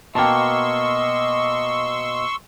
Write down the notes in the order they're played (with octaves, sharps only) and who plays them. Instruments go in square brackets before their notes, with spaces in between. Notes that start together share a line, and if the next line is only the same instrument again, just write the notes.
[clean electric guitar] B2 A#3 [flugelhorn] D#5 [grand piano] G5 A5 [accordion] C6 C#6 E6